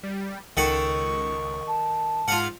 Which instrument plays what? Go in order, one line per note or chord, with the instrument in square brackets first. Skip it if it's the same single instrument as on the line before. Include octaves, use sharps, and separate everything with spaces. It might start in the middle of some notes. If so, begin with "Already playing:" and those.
[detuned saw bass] G3
[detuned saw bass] C#2 [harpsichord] D#3 A4 F#5 [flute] C#6
[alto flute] A5
[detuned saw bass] G#2 [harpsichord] F4 F5 F#5 [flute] F6